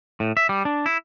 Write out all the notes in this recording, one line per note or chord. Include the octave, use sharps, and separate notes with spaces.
A2
E5
G3
D4
E4